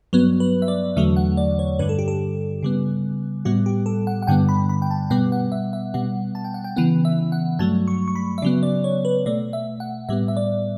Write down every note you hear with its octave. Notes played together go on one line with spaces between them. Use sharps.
G2 F#3 B3 B4
B4
E5
D5
E2 D3 F#3 A3 E5
F#5
D5
C#5
G2 D3 G3 B4
A4
G4
A4
C#3 G3 B3
A2 G3 B3 F#4
G4
A4
F#5
F#5
G2 D3 G3 B3 G5
B5
B5
G5
A5
B2 G3 B3 G5
F#5
E5
E5
B2 G3 B3 F#5
A5
G5
F#5
G5
C#3 E3 B3 F#5
E5
F#5
G2 F#3 A3 A5
C#6
C#6
B5
E5
C#3 F#3 B3 D5
D5
C#5
B4
B2 A3 D5
E5
F#5
A2 G3 B3 E5
E5
D5